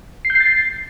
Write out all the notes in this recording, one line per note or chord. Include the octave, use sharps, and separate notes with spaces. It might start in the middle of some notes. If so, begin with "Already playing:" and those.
C7
G6
C7
A6
C7